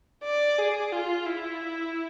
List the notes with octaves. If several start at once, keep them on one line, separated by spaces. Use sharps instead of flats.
D5
G#4
F4
E4